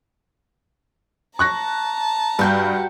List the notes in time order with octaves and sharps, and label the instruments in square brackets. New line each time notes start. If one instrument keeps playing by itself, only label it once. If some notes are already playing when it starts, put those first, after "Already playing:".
[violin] A5 A#5 [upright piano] C#6 F#6 A#6
[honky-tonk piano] G2 G6 [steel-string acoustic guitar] F#4 G4 F#5